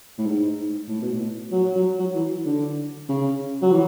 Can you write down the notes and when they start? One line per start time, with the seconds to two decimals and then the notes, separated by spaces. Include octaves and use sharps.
0.18 A2
0.26 G#2
0.89 A2
1.01 B2
1.13 A2
1.51 F#3
1.75 F#3
2.00 F#3
2.15 E3
2.46 D3
3.09 C#3
3.62 F#3
3.72 E3